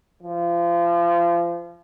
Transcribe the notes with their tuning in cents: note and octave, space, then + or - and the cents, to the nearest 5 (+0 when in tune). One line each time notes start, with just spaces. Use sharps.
F3 -30